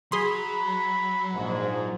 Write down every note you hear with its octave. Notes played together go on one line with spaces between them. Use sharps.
F#3 G#4 B5 C6
A#1 G#2